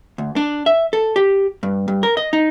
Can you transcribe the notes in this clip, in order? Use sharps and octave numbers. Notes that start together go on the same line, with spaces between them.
D2
D4
E5
A4
G4
G2
G2
A#4
D#5
D#4